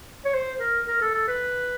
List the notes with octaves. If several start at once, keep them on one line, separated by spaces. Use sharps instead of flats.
C#5
C5
A#4
A#4
A4
A4
B4